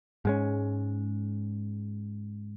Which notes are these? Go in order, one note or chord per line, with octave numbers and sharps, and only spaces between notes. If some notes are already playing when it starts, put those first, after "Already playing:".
G#2 G#3 C#4